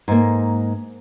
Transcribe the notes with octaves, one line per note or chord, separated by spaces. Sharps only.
G#2 A#3